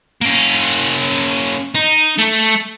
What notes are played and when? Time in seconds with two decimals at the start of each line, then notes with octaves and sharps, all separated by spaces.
0.21 A#3 C#4
1.75 D#4
2.18 A3